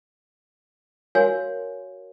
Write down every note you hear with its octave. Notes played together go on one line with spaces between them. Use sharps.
F#4 A#4 C#5 F5 G#5 C6